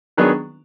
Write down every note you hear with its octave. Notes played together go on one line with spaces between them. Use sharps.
D#3 F#3 B3 D4 G#4